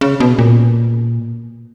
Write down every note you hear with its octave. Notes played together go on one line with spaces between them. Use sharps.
C#3
B2
A#2